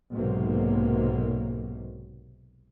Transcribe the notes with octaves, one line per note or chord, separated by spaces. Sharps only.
B1 G#2 C3 F#3 A#3